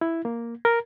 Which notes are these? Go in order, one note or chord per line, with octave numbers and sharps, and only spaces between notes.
E4
A#3
A#4